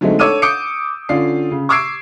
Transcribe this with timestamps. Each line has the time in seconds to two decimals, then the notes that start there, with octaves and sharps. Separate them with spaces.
0.01 D3 F#3 G#3 A3 C4 D#4
0.19 D4 A4 C#5 D6 E6 D#7
0.42 D6 D#6 G6 C#7 D7
1.09 D3 C#4 F4 D5 C7
1.51 C#3
1.69 C#6 D6 E6 G#6 C7 D7